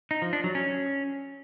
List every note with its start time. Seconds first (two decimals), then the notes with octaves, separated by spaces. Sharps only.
0.11 D#4
0.22 F3
0.33 D4
0.44 F#3
0.55 C#4